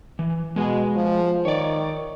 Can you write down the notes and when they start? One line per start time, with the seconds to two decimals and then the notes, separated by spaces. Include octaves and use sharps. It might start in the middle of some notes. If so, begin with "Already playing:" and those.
0.19 E3
0.56 B2 G#3 G#4
0.95 F3
1.45 D#3 C#5 D5